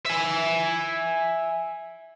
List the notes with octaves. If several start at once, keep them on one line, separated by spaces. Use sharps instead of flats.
E5 G#5